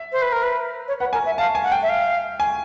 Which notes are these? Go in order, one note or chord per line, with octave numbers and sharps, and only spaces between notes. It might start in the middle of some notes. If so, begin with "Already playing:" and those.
Already playing: E5
C5
B4
A#4
B4
C#5
B4 F#5
A#4 G#5
E5
F5 A5
G#5
F#5
G5
E5
F5
G#5